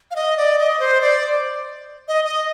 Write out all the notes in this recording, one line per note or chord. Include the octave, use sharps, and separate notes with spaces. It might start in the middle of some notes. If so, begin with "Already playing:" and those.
F5
D#5
D5
D#5
C5
D5
D#5
D#5